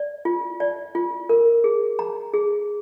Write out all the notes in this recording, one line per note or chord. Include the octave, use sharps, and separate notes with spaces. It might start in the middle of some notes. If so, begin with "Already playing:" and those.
Already playing: D5
F4
D5
F4
A#4
G#4
A#5
G#4